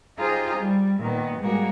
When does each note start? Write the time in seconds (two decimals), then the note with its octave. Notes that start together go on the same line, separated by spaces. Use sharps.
0.18 D#4 F4 G4 G#4 C5 A#5
0.57 G3
0.99 A#2 D#3 A#3 B3
1.39 G#2 G3 G#3 A#3 F#4